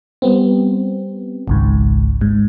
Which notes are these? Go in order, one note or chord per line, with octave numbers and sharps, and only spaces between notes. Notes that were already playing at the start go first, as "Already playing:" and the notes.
G3 B3 C4
G#1 C#2 G#2
G#2